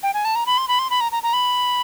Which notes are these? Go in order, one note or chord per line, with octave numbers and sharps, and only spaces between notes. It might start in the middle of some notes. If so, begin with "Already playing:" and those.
G5
G#5
A5
A#5
B5
C6
B5
C6
B5
A#5
A#5
A#5
B5